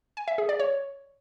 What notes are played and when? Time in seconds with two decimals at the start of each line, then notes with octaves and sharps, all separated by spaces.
0.17 G#5
0.28 E5
0.38 G#4
0.49 D5
0.60 C#5